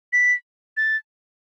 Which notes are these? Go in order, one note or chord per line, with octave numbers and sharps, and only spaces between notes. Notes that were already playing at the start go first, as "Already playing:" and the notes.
B6
A6